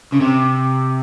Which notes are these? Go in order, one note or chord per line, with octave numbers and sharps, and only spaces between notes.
C#3
C3